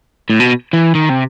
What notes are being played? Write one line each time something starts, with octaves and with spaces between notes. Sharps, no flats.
A2
B2
E3
D#3
C3